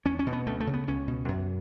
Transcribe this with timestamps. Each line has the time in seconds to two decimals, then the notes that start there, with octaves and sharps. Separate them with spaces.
0.05 E2 C#4
0.19 C#4
0.27 B2
0.33 B3
0.47 D2 A3
0.60 A3
0.67 C#3
0.74 B3
0.87 C#2 C#4
1.08 B2
1.28 F#2